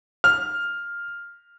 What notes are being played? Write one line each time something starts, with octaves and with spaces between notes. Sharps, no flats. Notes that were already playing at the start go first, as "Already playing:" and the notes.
F6